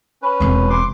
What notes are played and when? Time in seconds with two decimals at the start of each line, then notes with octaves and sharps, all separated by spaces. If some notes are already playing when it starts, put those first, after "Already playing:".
0.22 C#4 B4
0.40 E1 C4
0.70 C6 D6